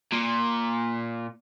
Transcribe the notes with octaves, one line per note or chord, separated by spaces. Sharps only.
A#2